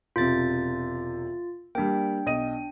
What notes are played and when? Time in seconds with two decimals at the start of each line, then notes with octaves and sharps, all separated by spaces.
0.16 E1 C3 F4 A6
1.75 G3 A#3 D4 G5
2.26 B1 D#5 D#7